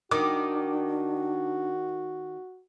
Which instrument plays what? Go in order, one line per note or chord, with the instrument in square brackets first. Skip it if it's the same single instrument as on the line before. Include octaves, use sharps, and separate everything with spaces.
[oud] D#3 [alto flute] D4 [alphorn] F#4 [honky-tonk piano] D6